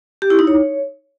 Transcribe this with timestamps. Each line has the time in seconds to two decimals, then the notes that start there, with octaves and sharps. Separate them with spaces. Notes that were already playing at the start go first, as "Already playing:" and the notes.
0.22 G4
0.30 E4
0.39 D#4
0.47 C#5